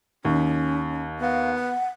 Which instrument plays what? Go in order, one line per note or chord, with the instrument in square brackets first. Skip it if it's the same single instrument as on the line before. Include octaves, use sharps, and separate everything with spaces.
[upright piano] D#2 [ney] C#4
[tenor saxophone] B3 [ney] F5
[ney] F#5